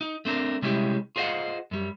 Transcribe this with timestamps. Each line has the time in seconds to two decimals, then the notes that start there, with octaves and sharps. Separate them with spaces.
0.01 D#4
0.25 A3 C4 D4 A#4
0.62 C3 G3 G#3 C#4 E4 G4
1.16 F4 G#4 C5 D#5 F5 F#5
1.71 F#2 G3